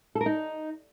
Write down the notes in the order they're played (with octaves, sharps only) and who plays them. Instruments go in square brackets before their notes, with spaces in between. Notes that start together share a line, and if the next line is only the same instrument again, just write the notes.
[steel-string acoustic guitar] A4
A#4
D#4